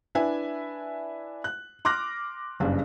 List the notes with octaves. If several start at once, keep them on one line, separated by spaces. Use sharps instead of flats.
D4 E4 B4 E5 G#5
F#6
C6 D6 F6 F#6 A#6
F#1 G2 C#3 D4